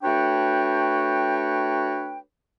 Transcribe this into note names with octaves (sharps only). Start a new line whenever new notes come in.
A3 D4 F#4 B4 C#5 G5